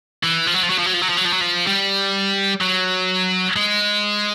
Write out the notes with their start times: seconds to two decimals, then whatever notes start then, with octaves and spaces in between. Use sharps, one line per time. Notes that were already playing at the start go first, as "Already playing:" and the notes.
0.24 E3
0.47 F3
0.54 F#3
0.63 F3
0.70 F#3
0.79 F3
0.86 F#3
0.94 F3
1.02 F#3
1.09 F3
1.17 F#3
1.25 F3
1.32 F#3
1.41 F3
1.67 G3
2.61 F#3
3.56 G#3